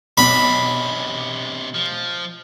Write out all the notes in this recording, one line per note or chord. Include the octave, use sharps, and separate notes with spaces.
B1 C3 D4 B5
F3